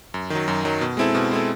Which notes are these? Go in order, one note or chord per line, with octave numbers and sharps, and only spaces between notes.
F#2
D#3 F#3
F#2
D#3 F#3
B2
G#3 C4 E4 A4
B2
G#3 C4 E4 A4